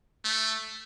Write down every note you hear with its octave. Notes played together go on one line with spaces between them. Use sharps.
A3